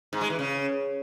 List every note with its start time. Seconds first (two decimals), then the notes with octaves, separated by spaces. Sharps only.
0.13 G#2
0.21 G#3
0.30 E3
0.39 C#3